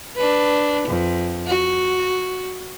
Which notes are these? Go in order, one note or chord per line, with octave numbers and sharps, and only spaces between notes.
D4 B4
F2
F#4